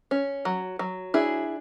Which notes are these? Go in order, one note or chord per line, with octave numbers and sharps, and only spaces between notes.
C#4
F#3
F#3
D4 E4 G#4